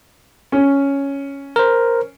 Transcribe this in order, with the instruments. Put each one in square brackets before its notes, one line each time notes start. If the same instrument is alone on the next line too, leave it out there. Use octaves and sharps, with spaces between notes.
[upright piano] C#4
[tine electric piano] A#4 C5